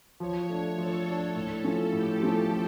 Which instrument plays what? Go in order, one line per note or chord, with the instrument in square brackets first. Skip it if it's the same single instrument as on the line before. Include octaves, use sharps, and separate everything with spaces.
[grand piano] F3 [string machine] C#5
[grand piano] A3 D4
[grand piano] F3 [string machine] A4
[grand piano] A3 D4
[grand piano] A2 [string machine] A4
[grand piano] F3 A3 C#4
[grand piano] A2 [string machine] G4
[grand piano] F3 A3 C#4
F3